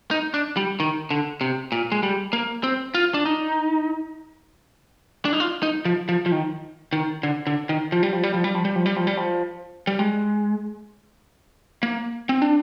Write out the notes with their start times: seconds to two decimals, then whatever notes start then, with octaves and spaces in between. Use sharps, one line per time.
0.11 D#4
0.34 D4
0.57 G3
0.80 D#3
1.11 D3
1.41 C3
1.72 A#2
1.92 G#3
2.03 G3
2.33 A#3
2.64 C4
2.95 F4
3.14 D4
3.26 D#4
5.25 D4
5.33 D#4
5.40 F4
5.63 D#4
5.85 F3
6.09 F3
6.26 F3
6.32 D#3
6.93 D#3
7.23 D3
7.47 D3
7.69 D#3
7.92 F3
8.03 G3
8.13 F3
8.23 G3
8.34 F3
8.44 G3
8.55 F3
8.65 G3
8.76 F3
8.86 G3
8.96 F3
9.07 G3
9.17 F3
9.87 G3
9.99 G#3
11.83 A#3
12.29 C4
12.42 D4